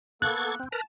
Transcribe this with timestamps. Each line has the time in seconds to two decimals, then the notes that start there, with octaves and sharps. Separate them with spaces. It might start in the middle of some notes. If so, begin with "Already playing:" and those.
0.22 A#3 B3 A4 C#6 F#6 G#6 A6
0.60 C4
0.72 A#4 B4 A5 A#5